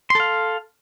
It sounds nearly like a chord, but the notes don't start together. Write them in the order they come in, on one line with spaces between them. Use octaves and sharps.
C6 A4 F5